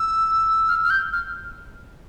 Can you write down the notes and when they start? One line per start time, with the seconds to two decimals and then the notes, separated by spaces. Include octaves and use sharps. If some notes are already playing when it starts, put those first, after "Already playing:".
Already playing: E6
0.68 F6
0.84 F6
0.90 G6
1.13 F6